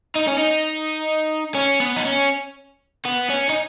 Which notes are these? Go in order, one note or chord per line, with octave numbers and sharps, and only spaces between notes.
D#4
C#4
D#4
C#4
B3
D#4
C#4
B3
C#4
D#4